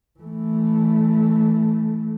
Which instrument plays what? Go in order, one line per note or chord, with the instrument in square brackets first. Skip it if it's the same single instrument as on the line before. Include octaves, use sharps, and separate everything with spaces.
[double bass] E3 A3